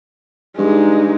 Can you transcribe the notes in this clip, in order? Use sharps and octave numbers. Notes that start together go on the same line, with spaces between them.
G2 G#3 D#4